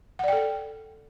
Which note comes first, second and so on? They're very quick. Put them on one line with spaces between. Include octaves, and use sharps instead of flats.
F#5 D5 G5 A4